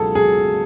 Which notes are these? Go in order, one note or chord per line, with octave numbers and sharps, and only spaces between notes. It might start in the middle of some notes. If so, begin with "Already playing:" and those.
Already playing: C#2 B2 F#3 G#4 A4
G#4